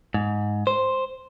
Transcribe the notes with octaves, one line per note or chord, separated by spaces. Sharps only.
G#2
C5